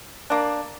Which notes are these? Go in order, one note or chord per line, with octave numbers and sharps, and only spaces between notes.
A#3 D4